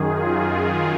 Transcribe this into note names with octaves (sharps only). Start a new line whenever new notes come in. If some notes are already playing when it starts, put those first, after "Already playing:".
Already playing: F#2 D#3 G#4
F4